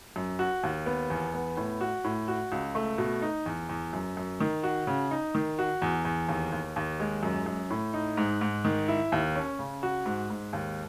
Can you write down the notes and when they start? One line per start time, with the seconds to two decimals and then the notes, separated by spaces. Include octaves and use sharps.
0.16 F#2
0.39 F#4
0.63 D#2
0.86 B3
1.10 E2
1.34 B3
1.57 A2
1.81 F#4
2.04 A2
2.28 F#4
2.52 C#2
2.75 A3
2.98 B2
3.22 D#4
3.46 E2
3.69 E2
3.93 F#2
4.17 F#2
4.40 D#3
4.63 F#4
4.87 C#3
5.11 D#4
5.35 D#3
5.59 F#4
5.82 E2
6.05 E2
6.28 D#2
6.52 D#2
6.76 D#2
7.00 G#3
7.23 F#2
7.46 F#2
7.70 A2
7.94 D#4
8.17 G#2
8.41 G#2
8.65 D#3
8.88 E4
9.12 D#2
9.36 C#4
9.59 C#3
9.83 F#4
10.06 G#2
10.30 G#2
10.53 D#2